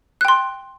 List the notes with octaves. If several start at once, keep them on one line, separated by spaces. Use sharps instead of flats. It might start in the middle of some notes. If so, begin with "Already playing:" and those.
G5 C6 F#6